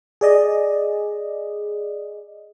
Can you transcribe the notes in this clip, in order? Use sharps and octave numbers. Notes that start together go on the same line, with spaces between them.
G#4 D5 D#5